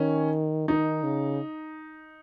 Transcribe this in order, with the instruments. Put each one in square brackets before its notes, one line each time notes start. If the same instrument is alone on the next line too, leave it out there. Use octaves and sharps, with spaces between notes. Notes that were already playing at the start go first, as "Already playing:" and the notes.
Already playing: [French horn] D#3 [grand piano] C#4
[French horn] D#3 [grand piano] D#4
[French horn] C#3